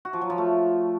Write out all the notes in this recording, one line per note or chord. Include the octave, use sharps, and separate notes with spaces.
F#4
F3
F#3
F3
A3